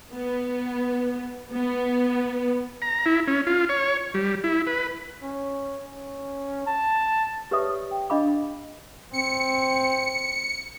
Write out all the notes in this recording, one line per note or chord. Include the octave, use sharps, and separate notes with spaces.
B3
B3
A#5
E4
C#4
F4
C#5
G3
E4
B4
C#4
C#4
A5
G4 B4 C#5 D5 E5 D#6
G5
D4 D#5 F5 B5 D6
C4 C#7